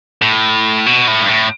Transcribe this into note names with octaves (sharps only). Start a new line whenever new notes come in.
A2
B2
A2
G2
A2